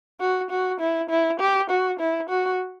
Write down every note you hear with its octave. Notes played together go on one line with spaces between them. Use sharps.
F#4
F#4
E4
E4
G4
F#4
E4
F#4